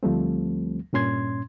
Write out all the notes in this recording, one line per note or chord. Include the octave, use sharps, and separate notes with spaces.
D2 F3 G3 A3 C4
G2 A#2 C#4 C6 G#6